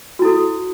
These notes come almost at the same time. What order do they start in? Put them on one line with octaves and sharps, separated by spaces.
F#4 E4 A4